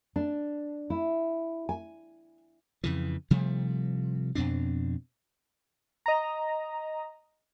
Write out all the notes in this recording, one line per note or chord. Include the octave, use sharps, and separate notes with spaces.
D4
E4
G#5
F2 C#3 E3
C3 F3 G3 A3
F2 B2 C4 D4
D#5 A#5